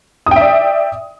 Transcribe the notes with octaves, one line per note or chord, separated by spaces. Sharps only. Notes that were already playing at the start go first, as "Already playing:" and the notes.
D5 E5 G5 D#6